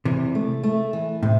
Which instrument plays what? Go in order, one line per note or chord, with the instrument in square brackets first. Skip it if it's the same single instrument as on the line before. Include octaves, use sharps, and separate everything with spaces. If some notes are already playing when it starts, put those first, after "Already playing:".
[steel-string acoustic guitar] E2 [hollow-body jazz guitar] C3 E3
[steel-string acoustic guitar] A3
A3
E3
[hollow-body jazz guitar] A2 [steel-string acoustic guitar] C3